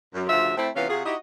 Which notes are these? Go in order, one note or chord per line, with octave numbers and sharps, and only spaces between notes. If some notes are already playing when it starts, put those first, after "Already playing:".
F#2
D2 C#3 F3 F4 F#4 E5
A3 C4 E4
C3 E3 B3 C#4 F4 F5
C3 F4 F#4 G#4
D#4 E4 F#4 G4 D#5